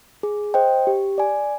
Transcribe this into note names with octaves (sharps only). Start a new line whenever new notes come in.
G#4
C5 D#5 G5
G4
D5 G#5